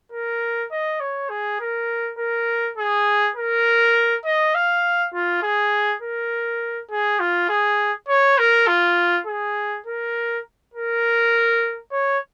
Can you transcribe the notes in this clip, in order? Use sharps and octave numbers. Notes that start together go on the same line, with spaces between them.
A#4
D#5
C#5
G#4
A#4
A#4
G#4
A#4
D#5
F5
F4
G#4
A#4
G#4
F4
G#4
C#5
A#4
F4
G#4
A#4
A#4
C#5